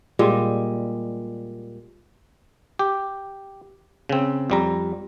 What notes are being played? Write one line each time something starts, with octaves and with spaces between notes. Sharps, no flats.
A#2 G3 G#3
G4
C#3 C4
F2 G3 A#5